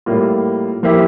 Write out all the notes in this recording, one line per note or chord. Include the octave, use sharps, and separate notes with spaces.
A2 G3 A#3 F4
F3 A#3 E4 G4